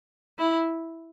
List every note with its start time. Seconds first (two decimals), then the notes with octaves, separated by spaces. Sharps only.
0.38 E4